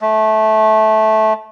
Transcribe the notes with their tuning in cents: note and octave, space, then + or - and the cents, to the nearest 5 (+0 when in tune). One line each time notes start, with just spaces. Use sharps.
A3 -15